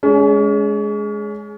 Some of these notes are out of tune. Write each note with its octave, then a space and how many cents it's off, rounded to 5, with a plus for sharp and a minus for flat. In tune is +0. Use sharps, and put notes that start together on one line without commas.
G#3 +10 C#4 +35